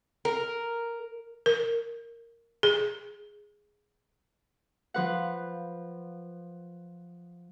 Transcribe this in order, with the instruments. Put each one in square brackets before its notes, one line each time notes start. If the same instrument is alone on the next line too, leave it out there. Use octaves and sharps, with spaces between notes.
[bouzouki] A#4
[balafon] A#4
G#4
[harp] F3 B4 F#5